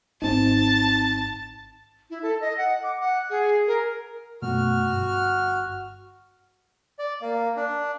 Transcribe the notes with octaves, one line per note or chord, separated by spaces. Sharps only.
G#1 C4 D#4 A5
E4
A4
D#5
F#5
D6
F#5
G#4
A#4
F#2 B2 A3 F#4 F6
G1
D5
A#3
D4